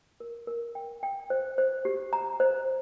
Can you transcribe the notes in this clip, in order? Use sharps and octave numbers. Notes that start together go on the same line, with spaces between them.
A#4
A#4
G5
G5
C5
C5
G4
A#5
C5